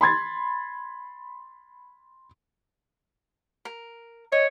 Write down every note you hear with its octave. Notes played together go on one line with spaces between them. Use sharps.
B5 C6 G#6 A6
A#4
C#5 D#5